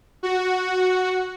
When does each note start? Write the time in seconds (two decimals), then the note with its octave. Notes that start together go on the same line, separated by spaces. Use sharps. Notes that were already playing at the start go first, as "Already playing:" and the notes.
0.23 F#4